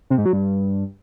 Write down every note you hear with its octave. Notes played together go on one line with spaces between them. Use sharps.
C3
G#2
F#3
G2